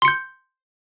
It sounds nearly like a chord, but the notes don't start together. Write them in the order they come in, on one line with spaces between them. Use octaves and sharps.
C6 C#7 G6